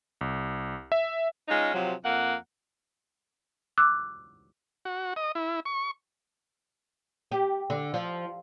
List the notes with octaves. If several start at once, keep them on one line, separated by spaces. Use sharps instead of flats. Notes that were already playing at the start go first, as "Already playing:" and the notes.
C2
E5
G#3 C#4 D#4 F4
C3 F3 F#3
F2 A#3 F#5
D6 E6 F#6
F#4
D#5
E4
C#6
G4
D3
F3